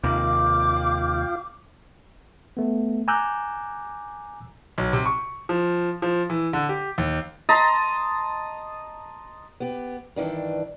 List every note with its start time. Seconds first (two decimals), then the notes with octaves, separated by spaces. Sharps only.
0.04 D#2 C3 D#3 F4 F5 G5 D6
2.57 A3 B3
3.08 G#5 A#5 D6 E6 F#6 G6
4.78 B1
4.93 C3
5.06 C#6
5.49 F3
6.02 F3
6.30 E3
6.53 D3
6.69 G4
6.98 D#2
7.49 D#5 A5 A#5 C6
9.60 B3 G4
10.16 G2 D#3 E3 D4